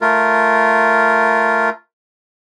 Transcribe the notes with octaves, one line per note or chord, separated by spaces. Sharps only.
A3 F4 A#4